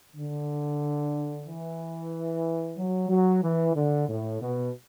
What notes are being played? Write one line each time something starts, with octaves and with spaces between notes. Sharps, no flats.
D3
E3
F#3
F#3
E3
D3
A2
B2